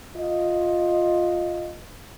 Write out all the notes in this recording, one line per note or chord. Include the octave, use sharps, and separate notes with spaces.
F4 D#5